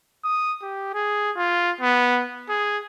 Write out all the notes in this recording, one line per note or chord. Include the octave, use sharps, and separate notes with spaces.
D#6
G4
G#4
F4
B3
G#4